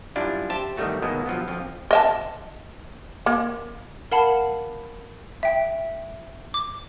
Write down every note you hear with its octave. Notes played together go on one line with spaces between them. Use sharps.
F#2 G3 D4 E4 F4
G4 C5 E5 A5
G1 D#3 F#3 G3 A3 F#4
B2 D#3 F#3 G#3 A#3
G2 F3 F#3 B3
F2 F3
D#5 E5 A5
A#3
A#4 F5 F#5 A5 B5
E5 G5
D6